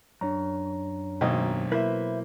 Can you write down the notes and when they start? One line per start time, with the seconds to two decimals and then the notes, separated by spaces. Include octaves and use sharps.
0.21 F#2 D4 C#5 A#5
1.21 G#1 D#2 B2 F#3 C5 D#5
1.72 A#3 E4 B4 C5 E5